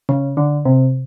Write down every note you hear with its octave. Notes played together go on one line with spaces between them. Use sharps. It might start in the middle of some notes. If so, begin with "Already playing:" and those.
C#3
D3
C3